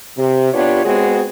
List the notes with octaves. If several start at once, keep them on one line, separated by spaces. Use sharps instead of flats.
C3
B3 D4 F4 G4 B4 C#5
G#3 B3 C4 F#4 G#4